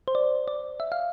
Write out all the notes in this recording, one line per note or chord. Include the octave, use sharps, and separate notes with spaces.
C5
D5
D5
E5
F5